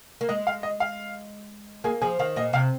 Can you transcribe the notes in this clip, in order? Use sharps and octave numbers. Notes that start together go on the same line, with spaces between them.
A#3
G#3 D#5
F5
D#5
F5
A#3 G#4 G#5
F3 G#4 G#5
D#3 F5
A#2 D#5
C3 F5